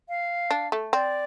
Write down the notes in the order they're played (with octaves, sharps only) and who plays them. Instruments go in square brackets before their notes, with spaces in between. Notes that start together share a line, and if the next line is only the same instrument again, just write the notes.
[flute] F5
[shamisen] D4
A3
[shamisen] C4 [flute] D5